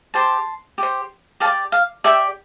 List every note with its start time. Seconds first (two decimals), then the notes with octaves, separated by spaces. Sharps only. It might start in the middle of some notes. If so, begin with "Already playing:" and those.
0.14 G4 C5 A5 C6
0.78 G4 C5
1.40 G4 F5 A5
1.45 D5
1.72 F5
2.04 G4 D5 E5 G5